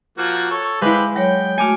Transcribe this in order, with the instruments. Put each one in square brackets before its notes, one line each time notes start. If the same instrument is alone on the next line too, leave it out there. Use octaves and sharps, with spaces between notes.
[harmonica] F3 A#3 F#4
A4 C#5
[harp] G#3 E4 [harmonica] G4 B4 C5 [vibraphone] F5
[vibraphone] F#3 C#5 [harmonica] G5
[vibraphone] A3 F#4 [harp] G#5 D6 F6